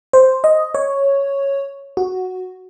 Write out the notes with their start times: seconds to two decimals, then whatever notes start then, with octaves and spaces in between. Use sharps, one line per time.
0.13 C5
0.44 D#5
0.75 C#5
1.97 F#4